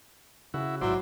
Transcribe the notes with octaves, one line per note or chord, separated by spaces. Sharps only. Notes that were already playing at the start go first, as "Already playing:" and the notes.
C#3 E4 F#4
A1 G#2 F#3 E4 C5 D5